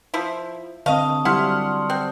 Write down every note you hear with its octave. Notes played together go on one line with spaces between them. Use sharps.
F3 E4
D3 C4 D#5 F5 A5 C#6 D#6
F#3 G3 E4 F#5 C6 F6
C4 F#6